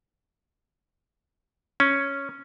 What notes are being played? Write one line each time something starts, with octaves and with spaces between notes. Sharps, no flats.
C#4